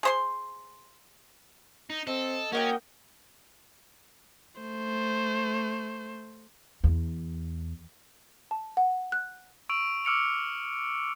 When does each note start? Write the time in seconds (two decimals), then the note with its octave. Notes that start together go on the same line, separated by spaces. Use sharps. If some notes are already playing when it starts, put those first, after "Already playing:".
0.03 G#4 C5 C6
1.90 D#4
2.07 C4 A4 D#5
2.52 A#3 C#4 F#4 D#5 G5
4.61 A3 C5
6.84 E2
8.51 A5
8.77 F#5
9.12 F#6
9.69 C#6 E6 D7 F7
10.05 D6 E6 F6 C#7 D7 F7